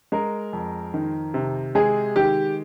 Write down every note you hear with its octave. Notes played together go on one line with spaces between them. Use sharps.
G#3 A#4
F2
D#3
C3
G#3 G#4
D#3 G4